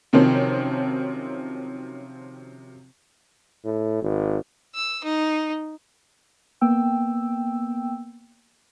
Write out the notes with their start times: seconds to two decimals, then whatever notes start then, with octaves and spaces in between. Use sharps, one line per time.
0.13 C3 D#3 F3 F#3 C4 C#4
3.64 A2
4.02 G#1
4.75 E6
5.04 D#4
6.61 A#3 B3 G5 E6